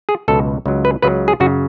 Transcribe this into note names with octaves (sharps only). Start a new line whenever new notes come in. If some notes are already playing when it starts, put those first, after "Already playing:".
G#4
C#2 B2 F#3 A4
C#2 C#3 F#3
B4
C#2 C#3 F#3 B4
G#4
F#2 C#3 F#3 F#4